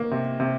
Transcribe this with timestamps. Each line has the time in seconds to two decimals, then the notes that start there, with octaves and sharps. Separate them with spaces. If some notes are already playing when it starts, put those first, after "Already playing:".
Already playing: D#3 A#3
0.11 C3
0.40 C3